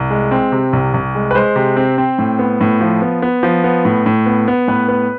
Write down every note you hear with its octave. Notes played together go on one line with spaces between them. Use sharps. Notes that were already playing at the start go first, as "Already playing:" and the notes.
Already playing: C2
G#3
C4
C3
C2
C2
G#3
B4
G#3 C5
C3
C4
C4
A2
B3
A2
F3
B3
B3
F3
B3
A2
A2
B3
B3
A2 B4
B3